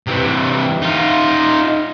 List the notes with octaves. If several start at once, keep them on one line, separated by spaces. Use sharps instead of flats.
C3 E3
D#4 F4